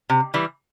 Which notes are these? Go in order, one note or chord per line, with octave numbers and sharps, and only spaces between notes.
C3
E3 G3